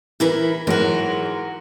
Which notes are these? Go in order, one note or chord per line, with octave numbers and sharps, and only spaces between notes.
E3 E4 A#4 B4
G#2 E3 F#3 F#4 A#4